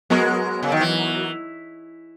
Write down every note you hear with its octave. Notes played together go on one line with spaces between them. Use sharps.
F#3 G#3 B3 F#4 A#4
C#3
D#3
E3